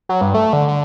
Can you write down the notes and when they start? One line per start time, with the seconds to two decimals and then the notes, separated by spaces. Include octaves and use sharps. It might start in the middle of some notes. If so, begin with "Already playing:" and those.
0.09 F#3
0.21 G2
0.34 A3
0.53 D3
0.68 D3